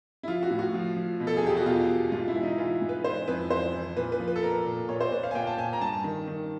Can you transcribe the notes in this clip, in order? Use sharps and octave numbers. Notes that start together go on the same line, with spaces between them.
E4
F3 F4
F#4
A2
F#4
F3
F3
B2
A4
G#4
E2 G4
F#4
B2 F4
B2
G#2 F4
E4
E3
D#4
E3 F4
G#2
B4
E3 C5
F2 B4
F2 C5
E3
A#2 B4
B4
F3
B4
A4
A#2 A#4
A#2
A#2 C#5
C5
A#2 B4
F5
G#5
A#2 G5
A5
A#2 G#5
A#5
G2 A5
D#3
D#3